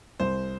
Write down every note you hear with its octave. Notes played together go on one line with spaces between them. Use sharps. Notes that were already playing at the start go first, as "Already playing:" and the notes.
C2 C5